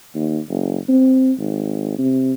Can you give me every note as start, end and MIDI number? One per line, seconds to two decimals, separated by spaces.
0.15 0.39 39
0.49 0.78 30
0.89 1.32 60
1.39 1.97 32
1.98 2.33 48